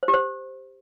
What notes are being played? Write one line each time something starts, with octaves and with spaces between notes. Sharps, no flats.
C5
G4
C5